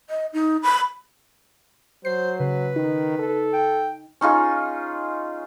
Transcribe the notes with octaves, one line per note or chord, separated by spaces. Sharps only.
D#5
D#4
B5
F#3 C5 C7
C#3 B4
D#3 D#4
A4
G5
C#4 D#4 F4 G#4